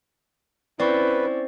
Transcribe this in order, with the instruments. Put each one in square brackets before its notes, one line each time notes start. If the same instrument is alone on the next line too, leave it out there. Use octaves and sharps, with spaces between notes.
[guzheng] C4 [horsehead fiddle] C#4 E4 [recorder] B4 [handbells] D5 C#6